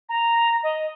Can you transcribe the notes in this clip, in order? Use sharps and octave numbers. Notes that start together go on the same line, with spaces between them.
A#5
D#5